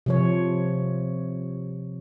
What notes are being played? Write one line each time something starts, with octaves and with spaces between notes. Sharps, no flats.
C3 F3 C#5